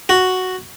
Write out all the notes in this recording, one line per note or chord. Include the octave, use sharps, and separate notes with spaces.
F#4